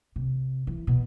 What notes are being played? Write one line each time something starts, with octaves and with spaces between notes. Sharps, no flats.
C3
E3
B2